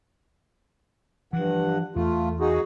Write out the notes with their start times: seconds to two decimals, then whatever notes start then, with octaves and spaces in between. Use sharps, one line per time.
1.33 G2 E3 F3 F#5
1.96 E2 A3 F4
2.40 D#4 F#4 G#4